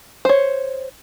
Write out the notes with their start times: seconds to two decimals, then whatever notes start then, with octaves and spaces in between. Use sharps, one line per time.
0.25 C5 C#5